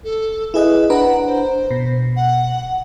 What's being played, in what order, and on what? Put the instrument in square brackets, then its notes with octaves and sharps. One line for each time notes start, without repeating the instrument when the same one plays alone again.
[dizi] A4
[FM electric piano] E4 G#4 D#5 [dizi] B4
[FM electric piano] D4 B4 A#5 [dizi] F#5
[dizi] C5
[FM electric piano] B2
[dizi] F#5